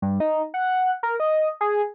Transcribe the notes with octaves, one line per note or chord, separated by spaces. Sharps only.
G2
D#4
F#5
A#4
D#5
G#4